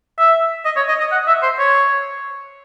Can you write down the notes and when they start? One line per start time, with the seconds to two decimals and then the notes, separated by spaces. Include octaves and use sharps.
0.19 E5
0.65 D#5
0.76 C#5
0.88 D#5
1.00 D#5
1.12 F#5
1.27 E5
1.43 C5
1.59 C#5